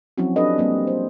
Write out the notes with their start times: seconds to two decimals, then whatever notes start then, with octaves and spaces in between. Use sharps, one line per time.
0.18 F3 F#3 C4 C#4 E4 F#4
0.36 D4 G4 A4 B4 D#5
0.58 G3 A#3 C4
0.87 C5